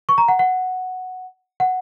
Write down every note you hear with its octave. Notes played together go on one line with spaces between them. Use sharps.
C#6
A#5
F#5
F#5
F#5